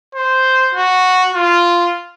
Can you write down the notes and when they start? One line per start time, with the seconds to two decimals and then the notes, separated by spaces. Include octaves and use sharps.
0.15 C5
0.75 F#4
1.34 F4